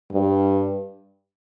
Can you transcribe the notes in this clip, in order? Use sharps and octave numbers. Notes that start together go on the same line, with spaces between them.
G2